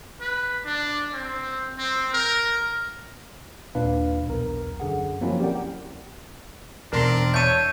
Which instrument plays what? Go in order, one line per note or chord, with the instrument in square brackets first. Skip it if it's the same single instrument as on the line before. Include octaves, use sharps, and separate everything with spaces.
[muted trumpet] B4
D4
C4
C4
A#4
[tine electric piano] D#2 A#2 D4 B4 F5
B1 E2 A#4
F#2 D3 G#4 F#5
F3 F#3 A#3 C4 C#4 E4
G4 A#4 D5 F#5 G5
[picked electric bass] E2 B2 [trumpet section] C4 D4 [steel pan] A#4 A#5 C6
[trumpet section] C#5 [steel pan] E5 A5 C#6 [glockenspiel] G6 D#7